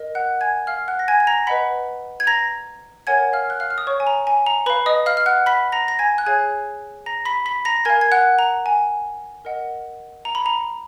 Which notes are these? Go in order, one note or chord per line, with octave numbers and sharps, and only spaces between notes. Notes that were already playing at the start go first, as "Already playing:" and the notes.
Already playing: A#4 D#5
F#5 F#6
G#5 G#6
F5 F6
F#5 F#6
A#6
G#5 G#6
G#6
A#5 A#6
B4 D#5 F#5 B5 B6
G#6
A#5 A#6
A#4 C#5 F#5 G#5 G#6
F5 F6
F#6
F5 F6
F6
D#6
C#5 C#6
G#5
A#5
G#5
A#5
B4 F5 B5
D#5 D#6
F5 F6
F6
F#5 F#6
B5 B6
A#5 A#6
A#6
G#5 G#6
F#6
G#4 C#5 F5 G#5 G#6
A#5 A#6
B5 B6
B5 B6
A#5 A#6
A#4 F5 G#5 G#6
G#6
F#5 F#6
A#5
G#5
A#4 D#5 F#5
A#5
B5
A#5